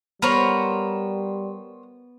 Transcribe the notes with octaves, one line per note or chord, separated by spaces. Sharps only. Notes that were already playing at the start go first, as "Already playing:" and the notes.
G3 B3 A#4 C5 C#5